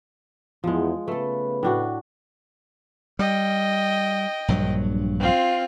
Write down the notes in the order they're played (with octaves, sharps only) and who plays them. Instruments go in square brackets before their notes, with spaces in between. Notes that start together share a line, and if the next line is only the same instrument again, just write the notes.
[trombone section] E2 [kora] F3 G#3
[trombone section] C#3 B3 B4 [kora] A3 A4
[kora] A2 D4 F#4
[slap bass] G3 [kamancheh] D#5 G5
[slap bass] A#1 G2 F#3
[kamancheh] C4 F4